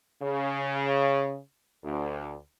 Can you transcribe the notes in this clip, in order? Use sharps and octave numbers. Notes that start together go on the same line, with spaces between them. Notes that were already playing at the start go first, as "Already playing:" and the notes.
C#3
D2